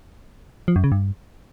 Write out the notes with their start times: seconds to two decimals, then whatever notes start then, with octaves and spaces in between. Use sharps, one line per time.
0.68 F3
0.76 F#2
0.84 C#3
0.92 G2